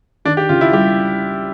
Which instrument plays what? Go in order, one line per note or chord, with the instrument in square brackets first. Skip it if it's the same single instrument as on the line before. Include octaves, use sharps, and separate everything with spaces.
[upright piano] D#3 [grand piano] D4
[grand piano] G4
[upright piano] C#2 [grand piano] F4
[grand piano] E4
[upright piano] G3 [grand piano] G4